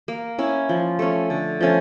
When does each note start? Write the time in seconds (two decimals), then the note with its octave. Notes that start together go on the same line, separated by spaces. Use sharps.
0.08 A#3
0.39 C#4 E4
0.69 F3
0.99 A3 C#4
1.30 D3
1.61 F3 A3 C#4